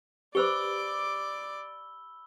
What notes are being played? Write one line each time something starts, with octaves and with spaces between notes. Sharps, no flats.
G4 B4 C5 D5 B5 D6 E6 G7